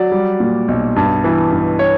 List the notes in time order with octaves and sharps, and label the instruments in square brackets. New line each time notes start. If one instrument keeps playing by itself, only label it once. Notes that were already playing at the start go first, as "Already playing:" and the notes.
Already playing: [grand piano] F#3 D5
G3
A#2
B1
G2
E3
G2
C#5